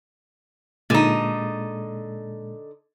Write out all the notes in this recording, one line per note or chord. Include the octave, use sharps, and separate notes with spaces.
A#2 D3 G#3 D#4